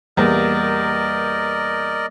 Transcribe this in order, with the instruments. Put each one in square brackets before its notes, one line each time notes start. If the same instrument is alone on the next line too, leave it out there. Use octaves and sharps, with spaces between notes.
[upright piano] E2 [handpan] G3 A#3 [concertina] A#4 D5 D#5